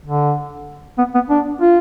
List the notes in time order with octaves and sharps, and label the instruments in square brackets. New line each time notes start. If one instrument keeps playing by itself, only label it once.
[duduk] D3
B3
B3
D4
F4